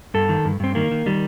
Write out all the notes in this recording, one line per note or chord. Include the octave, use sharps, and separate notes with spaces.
G2 A4
D#3
G2
G2 C4
D#3 A#3
D#3
D#3 G3